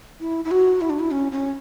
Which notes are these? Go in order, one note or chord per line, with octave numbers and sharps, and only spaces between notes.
E4
E4
F#4
E4
D4
E4
C#4
C#4